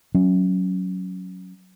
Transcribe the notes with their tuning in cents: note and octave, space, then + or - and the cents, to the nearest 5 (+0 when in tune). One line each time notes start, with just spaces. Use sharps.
F#3 +0 C#4 +0